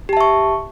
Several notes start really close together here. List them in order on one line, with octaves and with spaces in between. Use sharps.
G4 A5 E5 C#6